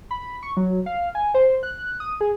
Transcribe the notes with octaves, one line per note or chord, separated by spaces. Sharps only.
B5
C#6
F#3
F5
G#5
C5
F#6
D#6
G#4